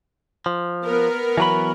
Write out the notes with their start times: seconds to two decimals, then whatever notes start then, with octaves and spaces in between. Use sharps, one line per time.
0.46 F3
0.85 B3 A#4
1.37 E3 F#3 B5